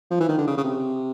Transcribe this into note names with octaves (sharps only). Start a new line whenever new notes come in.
F3
E3
D#3
D3
C#3
C#3
C3